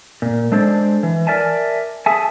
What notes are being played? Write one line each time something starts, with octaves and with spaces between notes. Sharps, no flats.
A#2
G#3 D4 A4 C5 D5
E3
A#4 D5 E5 G#5 A5
G#4 A4 E5 G#5 A5